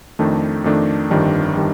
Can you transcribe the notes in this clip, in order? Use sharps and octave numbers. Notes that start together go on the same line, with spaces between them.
F2 D#3 A3 D4
F2 D#3 A3 D4
G1 F2 D#3 G3 D4
D#3 G3 D4